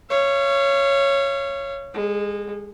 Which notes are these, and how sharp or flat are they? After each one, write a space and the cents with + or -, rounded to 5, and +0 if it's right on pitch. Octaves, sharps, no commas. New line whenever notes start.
C#5 +0 F5 -40
G#3 -25 G#4 +45